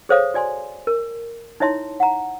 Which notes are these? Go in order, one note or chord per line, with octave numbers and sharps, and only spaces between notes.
G#4 A4 C5 C#5 F5 D#6
F#4 D5 G#5 C6
A#4
D#4 E4 C#5 E5 A5 C6
F#5 A#5